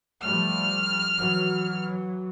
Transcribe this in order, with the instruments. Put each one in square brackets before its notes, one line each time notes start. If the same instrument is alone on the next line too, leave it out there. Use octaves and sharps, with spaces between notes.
[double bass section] F3 G3 A3 [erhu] F6
[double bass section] E3 F#3